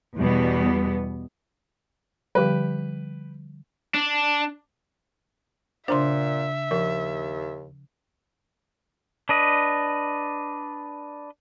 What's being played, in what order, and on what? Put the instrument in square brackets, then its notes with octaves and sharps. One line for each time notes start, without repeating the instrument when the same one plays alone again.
[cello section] E2 B2 G3 B3
[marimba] D3 F3 G3 [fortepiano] G4 B4
[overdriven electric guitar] D4
[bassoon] A#2 [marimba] C#3 D4 [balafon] C5 A#5 C6 [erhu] E5
[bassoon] D#2 [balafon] F3 A#4
[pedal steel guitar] D4 B4 D#5